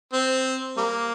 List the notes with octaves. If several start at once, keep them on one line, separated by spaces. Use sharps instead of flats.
C4
G3 A#3